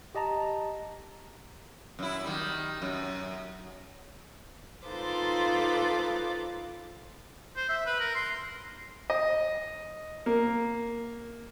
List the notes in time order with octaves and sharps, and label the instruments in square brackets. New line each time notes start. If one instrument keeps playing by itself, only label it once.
[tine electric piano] G4 D#5 A5 A#5
[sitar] F#2 E4
D#3 G3
F#2
[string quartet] D#4 F4 A4 B4 C5 D6
[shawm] C5
E5
B4
A#4
C6
[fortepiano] D#5
A#3